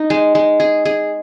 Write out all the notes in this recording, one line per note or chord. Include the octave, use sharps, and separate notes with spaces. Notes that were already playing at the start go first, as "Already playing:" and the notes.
Already playing: D#4
G#3
G#3
G#4
G#4